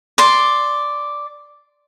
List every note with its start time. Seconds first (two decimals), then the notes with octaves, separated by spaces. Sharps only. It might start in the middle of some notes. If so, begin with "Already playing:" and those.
0.18 D5 C6